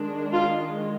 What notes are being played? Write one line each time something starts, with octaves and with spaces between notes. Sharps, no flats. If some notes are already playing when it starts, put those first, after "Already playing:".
Already playing: D#3 G#3 D4
F4